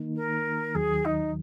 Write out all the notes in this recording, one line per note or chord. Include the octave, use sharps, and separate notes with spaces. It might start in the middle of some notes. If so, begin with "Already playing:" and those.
Already playing: D#3 A#3 D#4
A#4
D#2 D#3 F#3 G#4
D#4